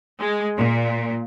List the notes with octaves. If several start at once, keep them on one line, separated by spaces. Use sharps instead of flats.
G#3
A#2